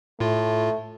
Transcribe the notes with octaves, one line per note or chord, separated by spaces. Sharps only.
A2 A3 F4